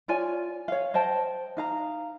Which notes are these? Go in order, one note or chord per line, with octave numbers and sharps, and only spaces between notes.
F4 C#5 D5 G#5
C#5 F5
C5 D#5 G5 A5
D#4 F5 A#5